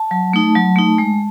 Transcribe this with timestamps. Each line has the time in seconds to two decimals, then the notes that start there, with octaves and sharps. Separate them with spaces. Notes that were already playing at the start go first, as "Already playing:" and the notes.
Already playing: A5
0.11 F#3
0.33 A3 D#4
0.55 F#3
0.76 A3 D#4
0.98 G#3